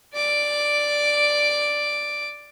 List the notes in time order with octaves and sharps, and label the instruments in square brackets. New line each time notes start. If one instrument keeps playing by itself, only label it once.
[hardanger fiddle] D5 D6